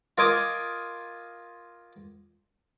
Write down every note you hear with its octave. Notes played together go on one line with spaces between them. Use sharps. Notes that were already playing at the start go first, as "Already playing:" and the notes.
F4 A#4 D#5 G#5 D6 D#6